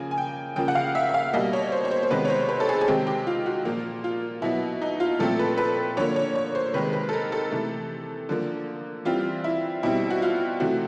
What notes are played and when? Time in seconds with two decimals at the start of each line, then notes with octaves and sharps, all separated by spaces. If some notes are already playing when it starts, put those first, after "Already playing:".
Already playing: C#3 F3 A#3 G#5
0.11 G#5
0.18 G5
0.56 C#3 F3 A#3 G5
0.68 F#5
0.75 F5
0.95 E5
1.09 E5
1.14 F5
1.33 B2 G3 A#3 D#5
1.53 C#5
1.72 C5
1.85 C#5
1.91 C5
2.03 C5
2.10 C3 D#3 G#3 B3 B4
2.25 C#5
2.30 C5
2.49 B4
2.60 A4
2.69 G#4
2.81 G#4
2.88 C3 D#3 G#3 C4 G4
3.07 G4
3.27 F4
3.46 F#4
3.65 A#2 F3 A#3 F4
4.04 F4
4.42 B2 F#3 B3 E4
4.82 D#4
5.00 F4
5.19 A#2 F3 A3 C4 A4
5.39 B4
5.58 B4
5.97 D3 F3 A#3 C#5
6.16 C#5
6.35 C#5
6.55 C5
6.74 C3 D#3 G#3 B4
6.93 B4
7.09 A4
7.13 A#4
7.32 A4
7.51 C3 E3 A3
8.29 D3 F3 A#3
9.05 E3 G3 C4 F4
9.44 E4
9.83 B2 G3 C4 E4
10.10 F#4
10.22 F4
10.60 C3 E3 A3 C4 F#4